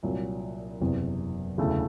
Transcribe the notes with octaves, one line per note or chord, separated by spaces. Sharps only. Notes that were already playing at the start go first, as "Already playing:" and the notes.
C2 A#2 F#3
F#1 E2 C3
E1 D2 C#3 E3 A3